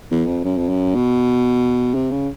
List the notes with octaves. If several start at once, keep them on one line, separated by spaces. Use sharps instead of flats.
E2
F2
F#2
F2
F#2
B2
C3
C#3